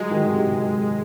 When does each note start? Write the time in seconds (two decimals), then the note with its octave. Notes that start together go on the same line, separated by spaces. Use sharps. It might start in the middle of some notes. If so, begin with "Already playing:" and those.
Already playing: F#3 G#3
0.11 D#3
0.31 C3